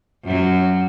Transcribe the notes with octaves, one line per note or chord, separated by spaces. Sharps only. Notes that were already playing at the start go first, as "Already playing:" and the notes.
F#2 F#3